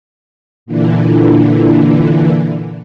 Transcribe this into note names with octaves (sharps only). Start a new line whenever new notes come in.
A#2 D3 E3